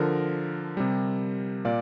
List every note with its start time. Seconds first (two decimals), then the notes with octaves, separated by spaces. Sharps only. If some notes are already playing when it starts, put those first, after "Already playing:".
Already playing: D3 F3 A#4
0.77 C3 G3
1.65 A#2 D5 F5